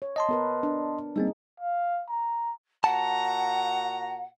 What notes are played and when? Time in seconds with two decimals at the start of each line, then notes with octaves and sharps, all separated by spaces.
0.02 C#5
0.16 D#5 A5 C6
0.29 B3 A#4 B4
0.63 D4
1.16 G3 A#3 C4 D#4 G#4
1.60 F5
2.09 A#5
2.84 A#2 F#4 F#5 A5 A#5